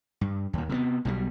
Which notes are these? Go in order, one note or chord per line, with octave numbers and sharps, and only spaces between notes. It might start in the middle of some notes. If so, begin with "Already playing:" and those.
G2
D#2 A#2
C3 D#3 B3
B1 B2 D#3 G3